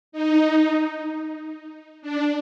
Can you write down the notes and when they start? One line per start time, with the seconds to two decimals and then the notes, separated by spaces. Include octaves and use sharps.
0.12 D#4
2.02 D4